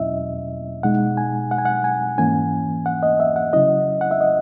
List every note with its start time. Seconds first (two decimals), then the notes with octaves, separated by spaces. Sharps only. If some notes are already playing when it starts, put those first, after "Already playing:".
Already playing: E2 B2 F#3 C#4 E4 D#5 E5
0.83 B2 G#3 D#4 F#5
1.17 G#5
1.51 F#5
1.58 G#5
1.65 F#5
1.84 G#5
2.18 G#2 E3 A#3 C#4 G#5
2.86 F#5
3.03 D#5
3.20 E5
3.36 F#5
3.53 C#3 F#3 C#4 E4 D#5
4.01 F#5
4.11 E5
4.21 D#5